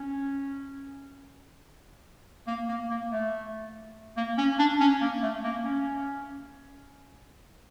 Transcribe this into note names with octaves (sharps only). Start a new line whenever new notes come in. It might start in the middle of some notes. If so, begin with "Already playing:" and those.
Already playing: C#4
A#3
A#3
A#3
A3
A#3
C#4
D4
C#4
A#3
A3
A#3
C#4